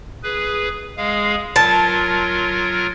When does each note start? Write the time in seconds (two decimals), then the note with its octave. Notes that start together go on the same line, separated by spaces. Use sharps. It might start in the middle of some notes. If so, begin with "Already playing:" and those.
0.23 G#4 B4
0.97 G#3 G#4 F5
1.56 F#3 F4 A#4 A5